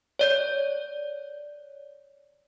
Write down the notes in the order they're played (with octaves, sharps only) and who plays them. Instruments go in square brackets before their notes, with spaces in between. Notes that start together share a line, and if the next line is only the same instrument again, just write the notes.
[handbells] C#5 D5 G6